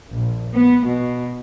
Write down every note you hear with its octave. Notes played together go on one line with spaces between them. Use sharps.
A#1
B3
B2